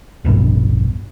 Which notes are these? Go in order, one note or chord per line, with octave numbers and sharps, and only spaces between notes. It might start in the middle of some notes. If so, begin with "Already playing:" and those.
D1 A#1 G2 B2